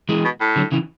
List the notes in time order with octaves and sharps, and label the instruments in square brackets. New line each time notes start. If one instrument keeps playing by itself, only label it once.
[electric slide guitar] E3 G#3
[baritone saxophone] B2
A2
[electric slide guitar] D3 F#3
C#3 E3